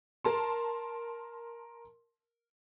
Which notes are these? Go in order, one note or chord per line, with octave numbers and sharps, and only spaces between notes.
A#4 A5 C6